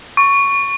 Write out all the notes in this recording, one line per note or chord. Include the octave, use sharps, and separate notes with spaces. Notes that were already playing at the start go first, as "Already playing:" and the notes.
C#6